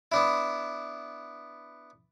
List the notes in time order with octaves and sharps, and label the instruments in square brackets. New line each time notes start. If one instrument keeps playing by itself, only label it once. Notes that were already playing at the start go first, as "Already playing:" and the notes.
[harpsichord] B3 D4 E4